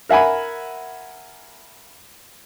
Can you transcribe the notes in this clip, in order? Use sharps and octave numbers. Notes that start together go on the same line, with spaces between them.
A#4 E5 F#5 G#5 B5